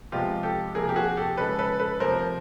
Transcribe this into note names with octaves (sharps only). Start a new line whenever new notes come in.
C3 F3 G#3 B3 F4 G4
G4 A4
C3 F3 A#3 G#4 A#4
G4
F#4 G#4
G4 A4
C#3 F3 G#3 A4 B4
A4 B4
A4 B4
C3 F3 A3 A#4 C5